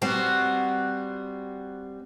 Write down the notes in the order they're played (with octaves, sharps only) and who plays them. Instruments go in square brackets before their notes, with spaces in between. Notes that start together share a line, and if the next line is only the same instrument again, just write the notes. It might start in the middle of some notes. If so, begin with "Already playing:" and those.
[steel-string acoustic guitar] G3 C4 C5 [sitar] B3 D4 F#4